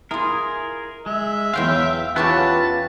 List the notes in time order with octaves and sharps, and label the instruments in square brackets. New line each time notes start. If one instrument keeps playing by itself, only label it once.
[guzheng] E4 F4 [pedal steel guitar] G#4 A#4
[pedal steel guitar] G#3 [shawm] E5
[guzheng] E2 F#3 C6 [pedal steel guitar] F5 G5
[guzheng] E3 C#4 G4 [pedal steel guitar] F4 B4 F#5 [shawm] A5